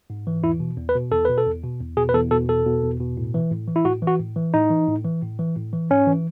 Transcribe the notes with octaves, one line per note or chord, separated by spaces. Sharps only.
G#2
E3
E2 E4
B2
E2
B4
B2
E2 A4
B2 B4
A4
E2
B2
E2
B2 G#4
B4
E2 A4
B2 A4
E2 A4
B2
E2
B2
A2
E3
A2
E3
E4
A2 F#4
E3
F#4
A2
E3
A2 D#4
E3
A2
E3
A2
E3
A2
E3
G#2 C#4
E3